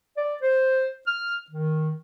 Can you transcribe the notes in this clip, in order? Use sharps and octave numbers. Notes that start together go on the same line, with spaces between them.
D5
C5
F6
D#3